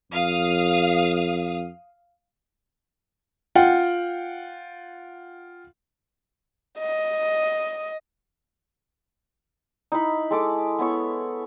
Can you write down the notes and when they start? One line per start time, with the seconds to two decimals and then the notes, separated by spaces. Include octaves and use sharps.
0.12 F2 F5 D#6
3.55 F4 F#5 G5
6.79 D#5
9.92 D#4 E4 B5
10.31 G#3 A4 D6
10.79 B3 E4 C#5 C#6